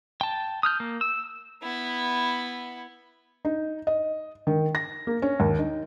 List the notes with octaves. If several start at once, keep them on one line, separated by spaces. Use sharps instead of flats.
G5 A5
D#6 F6 G6
A#3
E6
B3 E4
D#4
D#5
D#3
A#6
A#3
C#4
D#2
D#4